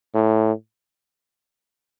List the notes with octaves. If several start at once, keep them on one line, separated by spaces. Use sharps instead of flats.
A2